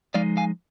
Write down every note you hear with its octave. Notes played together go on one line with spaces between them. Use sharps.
F3 G#3 D#4 D5 F5
F5 G#5